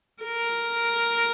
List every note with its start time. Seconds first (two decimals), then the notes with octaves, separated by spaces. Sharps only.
0.22 A#4